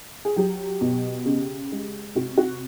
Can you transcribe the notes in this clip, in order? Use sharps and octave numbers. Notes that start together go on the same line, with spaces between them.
G#4
F#3 G4
B2
C#3
G#3
C3 F#4
F#4